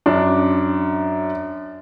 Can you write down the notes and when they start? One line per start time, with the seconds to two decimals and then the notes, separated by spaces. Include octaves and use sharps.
0.06 F#2 D4